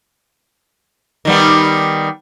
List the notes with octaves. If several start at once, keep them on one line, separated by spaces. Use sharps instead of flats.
D#3 G3 B3